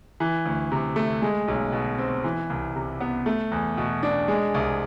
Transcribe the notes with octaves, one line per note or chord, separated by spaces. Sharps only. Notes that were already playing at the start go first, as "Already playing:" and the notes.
E3
D2
C3
A3
G#3
B1
B2
C4
E3
C2
C3
B3
A3
E2
B2
D4
G#3
C2